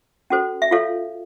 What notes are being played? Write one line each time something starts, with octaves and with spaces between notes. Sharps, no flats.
C#4 F#4 A4 C5
E5
F4 A4 C#5 F5